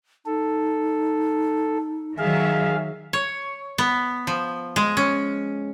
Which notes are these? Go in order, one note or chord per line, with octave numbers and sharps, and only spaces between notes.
D#4 A4
D#3 F#3 G#4 E5 F5
C#5
B3
F3
G#3
C#4